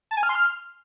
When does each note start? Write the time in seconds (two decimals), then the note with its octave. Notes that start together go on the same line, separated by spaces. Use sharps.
0.11 A5
0.17 G#5
0.23 F6
0.29 C6
0.35 F6